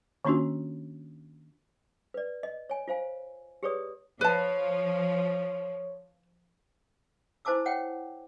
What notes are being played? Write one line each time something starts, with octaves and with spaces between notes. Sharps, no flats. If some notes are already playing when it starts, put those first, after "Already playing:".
D#3 A#3 C#4 D4 F4 F#4
B4 D5
D#5
C#5 G#5
F4 C5 F5 G#5
G4 G#4 B4 C#5 D5 D#6
F3 B4 C#5 A5
E4 C5 G#5 A5 D6 E6
C#5 F#5 G5